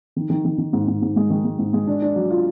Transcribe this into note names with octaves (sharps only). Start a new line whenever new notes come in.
D#3
D#3
D#3
D#3
G#2
G#2
G#2
G#3
D#3
G#3
G#2
G#3
D4
D4
F#3
F4